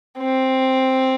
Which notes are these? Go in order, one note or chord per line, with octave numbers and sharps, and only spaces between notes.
C4